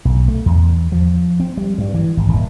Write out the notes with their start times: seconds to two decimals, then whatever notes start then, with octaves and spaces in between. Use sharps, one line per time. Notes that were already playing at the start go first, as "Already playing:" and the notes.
0.05 B1
0.28 A3
0.46 E2
0.92 F3
1.40 C4
1.57 G3
1.78 G2
1.94 E3
2.17 G#1
2.29 D#1